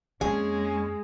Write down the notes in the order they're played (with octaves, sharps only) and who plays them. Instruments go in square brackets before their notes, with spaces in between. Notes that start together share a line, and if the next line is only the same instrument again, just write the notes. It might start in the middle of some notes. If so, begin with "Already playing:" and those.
[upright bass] F2 A#3 [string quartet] G#3 [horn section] C#4 [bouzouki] G#4